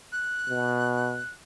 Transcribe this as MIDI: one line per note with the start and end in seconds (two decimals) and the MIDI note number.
0.12 1.30 90
0.49 1.22 47